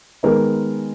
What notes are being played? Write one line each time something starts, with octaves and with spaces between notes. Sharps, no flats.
D#3 G#3 B3 D#4 A#4